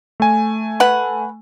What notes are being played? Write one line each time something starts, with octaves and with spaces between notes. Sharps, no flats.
A3 G#5
B4 F#5